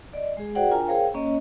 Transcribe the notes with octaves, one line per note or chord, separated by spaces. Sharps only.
D5 D#5
G#3 G#4
F#4 G#4 C5 D5 F#5 G5
D4 F4 A#4 G5 G#5 A#5
G#4 A#4 C5 C#5 F5 G5
A#3 C#4 C#5 D#5